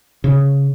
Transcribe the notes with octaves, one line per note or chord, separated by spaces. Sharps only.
C#3